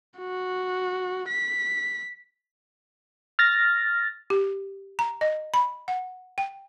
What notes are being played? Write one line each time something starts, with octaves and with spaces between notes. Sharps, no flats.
F#4
B6
F6 A6 A#6
G4
A#5
D#5
B5
F#5
G5